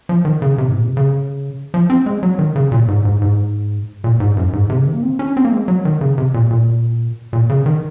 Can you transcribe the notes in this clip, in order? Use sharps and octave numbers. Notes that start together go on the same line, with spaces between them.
F3
D#3
C#3
C3
G#2
A#2
C3
C#3
F3
C4
G#3
F#3
D#3
C#3
A#2
G#2
G#2
G#2
A#2
G#2
F#2
G#2
C3
C#3
D#3
A#3
C4
C#4
C4
A#3
G#3
F#3
D#3
C#3
C3
A#2
A#2
A#2
C#3
D#3